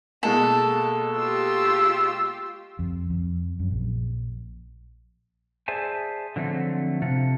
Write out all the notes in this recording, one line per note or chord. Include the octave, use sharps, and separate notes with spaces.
B2 G#3 A#3 A4 A5
F4 G4 E6
F2
F2
F#2
A#1
G#4 C5 D5 E5 G#5 A5
D3 F3 F#3 A3 C4
C3 F4 A4